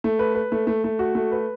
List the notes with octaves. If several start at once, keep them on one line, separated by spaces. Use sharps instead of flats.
A3
B4
B4
A3
A3
A3
F#4
A3
B4